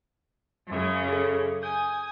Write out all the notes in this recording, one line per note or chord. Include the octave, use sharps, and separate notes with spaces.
F#2 C#3
G#4 A4
G#5 D#6 G6